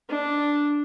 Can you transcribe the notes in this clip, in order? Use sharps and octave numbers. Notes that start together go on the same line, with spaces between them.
D4